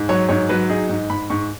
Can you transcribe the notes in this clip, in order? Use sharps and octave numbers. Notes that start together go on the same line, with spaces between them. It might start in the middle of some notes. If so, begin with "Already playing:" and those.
Already playing: G#2
F#3 C#5
G#2 C#5
F#3 B4
D#4 G#4
G#2
G#2 B5
G#2 C#6